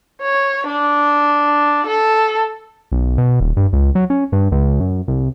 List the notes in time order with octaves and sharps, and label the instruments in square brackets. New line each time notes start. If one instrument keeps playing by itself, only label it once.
[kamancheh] C#5
D4
A4
[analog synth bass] B1
B2
D#1
G2
C#2
F#3
C#4
G2
C#2
F#2
C2